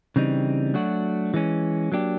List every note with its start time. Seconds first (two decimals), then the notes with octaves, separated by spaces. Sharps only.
0.16 C#3 E3 G3 C4 D#4
0.74 F#3 A3 D4 F#4
1.34 E3 G#3 C#4
1.92 F#3 A#3 D4 G4